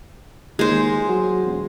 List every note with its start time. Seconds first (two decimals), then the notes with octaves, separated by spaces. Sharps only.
0.59 D#2 G#3 C5
1.09 F#3
1.46 E1